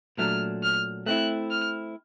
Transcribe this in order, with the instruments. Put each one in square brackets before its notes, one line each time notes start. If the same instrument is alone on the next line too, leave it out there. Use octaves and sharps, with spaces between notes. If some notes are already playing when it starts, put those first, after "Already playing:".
[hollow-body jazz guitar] A#2 F#3 A3 D4 [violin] F6
[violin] F6
[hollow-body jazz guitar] A3 C4 E4 [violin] F#6
[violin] F6